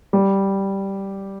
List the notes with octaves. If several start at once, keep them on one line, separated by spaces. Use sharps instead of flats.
G3